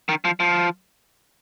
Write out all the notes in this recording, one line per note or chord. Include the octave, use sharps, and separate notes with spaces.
D#3
F3
F3